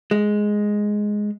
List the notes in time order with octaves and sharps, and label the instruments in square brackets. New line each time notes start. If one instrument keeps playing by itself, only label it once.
[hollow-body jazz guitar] G#3